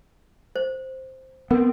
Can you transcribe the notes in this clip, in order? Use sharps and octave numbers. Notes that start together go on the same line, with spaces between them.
C5
B3 C4 A#4